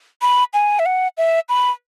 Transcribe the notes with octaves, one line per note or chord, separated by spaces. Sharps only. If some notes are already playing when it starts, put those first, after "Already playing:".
B5
G#5
E5
F#5
E5
B5